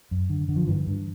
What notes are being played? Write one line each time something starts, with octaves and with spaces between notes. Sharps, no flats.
F#2
D3
D3
F3
G2 E3
G2